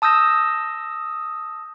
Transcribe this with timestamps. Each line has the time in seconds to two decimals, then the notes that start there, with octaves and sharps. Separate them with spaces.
0.02 A5 D#6 E6 G6 A#6